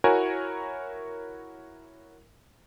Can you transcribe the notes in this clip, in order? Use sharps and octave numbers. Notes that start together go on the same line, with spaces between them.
E4 F#4 A#4 C#5 G#5